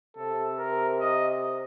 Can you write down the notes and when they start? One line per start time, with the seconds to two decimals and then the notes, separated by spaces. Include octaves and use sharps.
0.17 C3 A4
0.58 A#4
1.01 D#5